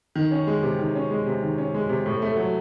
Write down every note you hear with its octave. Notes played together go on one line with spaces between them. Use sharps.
D#3
C#4
G#3
C3
D#3
C#4
G#3
C3
D#3
C#4
G#3
C3
A2
A3
F#3